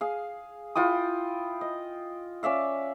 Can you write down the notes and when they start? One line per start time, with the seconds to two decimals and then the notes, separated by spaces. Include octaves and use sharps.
0.01 G#4 F5
0.75 E4 F4 G5 D#6
1.61 D#5
2.43 C#4 D5 E5 F5